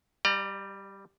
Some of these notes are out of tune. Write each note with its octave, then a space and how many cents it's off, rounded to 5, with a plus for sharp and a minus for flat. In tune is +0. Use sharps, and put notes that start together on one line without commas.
G3 +0 D5 +40 A#5 -10